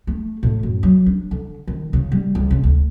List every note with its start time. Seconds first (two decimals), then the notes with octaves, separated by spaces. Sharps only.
0.07 A3
0.43 A2
0.63 F#2
0.83 F#3
1.06 D4
1.31 D3
1.68 D#3
1.93 C#3
2.12 G3
2.35 C#2
2.51 C#3
2.64 D2